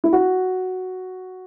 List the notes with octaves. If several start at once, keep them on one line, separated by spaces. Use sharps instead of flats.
E4
F#4